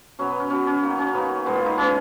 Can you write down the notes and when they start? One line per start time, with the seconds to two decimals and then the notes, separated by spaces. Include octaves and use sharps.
0.19 B2 F#3 B3 C#4
0.29 B3
0.40 C#4
0.50 B2 F#3 B3 C#4
0.67 C#4
0.82 D#3 F#3 A#3
0.99 C#4
1.13 D#3 F#3 A#3 B3
1.46 A#2 G#3 B3
1.55 F4
1.66 D#4
1.78 A#2 G#3 B3 C#4